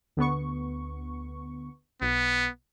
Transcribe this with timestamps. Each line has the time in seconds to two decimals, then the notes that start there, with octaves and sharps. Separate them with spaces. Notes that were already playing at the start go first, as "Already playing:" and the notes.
0.17 D2 B3 C#6
2.01 B1 B3